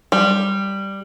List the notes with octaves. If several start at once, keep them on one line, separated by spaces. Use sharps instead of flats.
G3